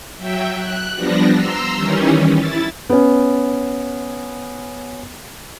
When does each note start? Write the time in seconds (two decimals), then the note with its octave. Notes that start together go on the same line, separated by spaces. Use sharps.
0.17 F#3 E5 G5
0.54 F#6
0.95 F3 G3 B3 D4 A#6
1.32 A#5 C6 E6
1.75 D#3 E3 G3 C#4
2.32 E4 A6
2.90 B3 C#4